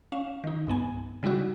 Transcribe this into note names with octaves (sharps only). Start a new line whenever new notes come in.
C#4 F5 E7
D#3 D#4
C2 G2 B3 G#5
C#3 G3 D#4 E4 F#4